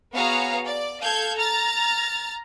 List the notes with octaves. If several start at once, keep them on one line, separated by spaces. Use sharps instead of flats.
B3 F#4 G#4 C#5 F5 A#5
D5
A4 F5 G6 G#6
A#5 F6 A6